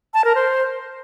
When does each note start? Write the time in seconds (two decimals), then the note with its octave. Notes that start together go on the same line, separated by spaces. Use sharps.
0.14 A5
0.24 A#4
0.35 C5